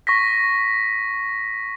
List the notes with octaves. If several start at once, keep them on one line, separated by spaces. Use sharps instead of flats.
C#6 A#6 B6